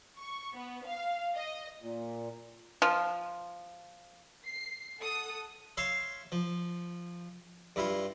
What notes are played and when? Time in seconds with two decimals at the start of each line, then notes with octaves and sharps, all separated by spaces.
0.18 C#6
0.55 B3
0.86 F5
1.36 D#5
1.82 A#2
2.82 F3
4.45 C7
4.99 A4 F#5 D#6
5.77 C#5 E5 F5 C6
6.32 F3
7.76 G2 E4 F4